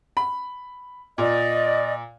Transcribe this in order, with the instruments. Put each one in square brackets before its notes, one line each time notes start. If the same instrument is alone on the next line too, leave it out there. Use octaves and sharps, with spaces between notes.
[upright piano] B5
[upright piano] A#2 [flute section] D5 D#5